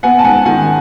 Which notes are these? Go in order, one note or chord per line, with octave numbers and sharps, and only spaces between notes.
B3 F#5 G#5
A5
G#2 F#5 G#5
D#3 F#5 G#5